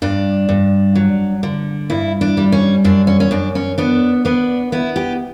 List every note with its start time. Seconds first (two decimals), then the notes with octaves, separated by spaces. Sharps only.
0.02 G2 D4
0.49 G2
0.95 F#3
1.43 D3
1.90 G2 E4
2.21 D4
2.37 G3
2.52 C#4
2.84 F#2 D4
3.07 C#4
3.20 C#4
3.31 F#2 D4
3.55 C#4
3.78 B3 D4
4.25 B3 D4
4.72 B3 E4
4.96 G4